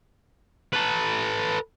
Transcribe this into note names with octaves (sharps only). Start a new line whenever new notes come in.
A4 B4